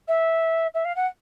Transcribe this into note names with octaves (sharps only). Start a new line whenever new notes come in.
E5
E5
F5
F#5